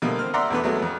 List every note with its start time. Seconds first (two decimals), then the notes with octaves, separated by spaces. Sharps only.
0.02 B2 D3 F3 G3 A3 A#3
0.19 C4 F6
0.34 D5 E5 F#5 A#5 C6
0.50 E2 A3 B3 D4 B4
0.64 F#3 G#3 A3 B3 F#4
0.82 F2